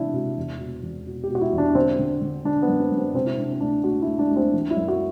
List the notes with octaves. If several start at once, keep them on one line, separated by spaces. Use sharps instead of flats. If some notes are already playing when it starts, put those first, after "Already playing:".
Already playing: C3 E3 D4 E4
C3 F#4
E2
B2
E2
B2
G4
B2
F#4
E4
E2
D4
D3 C4
D3
D3
D3 D4
B3
F#2
C4
F#2
C4
C3 C4
E4
C3 D4
C4
D2 D4
D2 F#4
D2 E4
D4
D2
C4
E3
E4
F#2
F#4